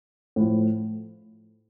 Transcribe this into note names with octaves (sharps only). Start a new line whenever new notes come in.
A2 F3